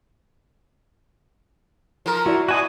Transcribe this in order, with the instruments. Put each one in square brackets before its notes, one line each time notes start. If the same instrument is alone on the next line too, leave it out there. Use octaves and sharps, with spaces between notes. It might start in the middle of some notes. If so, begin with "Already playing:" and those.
[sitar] F3 A#4
[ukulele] E4 D5 [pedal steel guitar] F#4
[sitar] B2 [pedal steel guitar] F#4 G#5 D#6